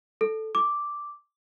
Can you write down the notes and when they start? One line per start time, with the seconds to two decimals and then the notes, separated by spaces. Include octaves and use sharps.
0.21 A4
0.55 D6